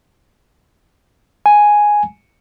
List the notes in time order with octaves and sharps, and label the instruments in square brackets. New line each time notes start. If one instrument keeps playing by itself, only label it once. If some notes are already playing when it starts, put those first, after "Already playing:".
[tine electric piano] G#5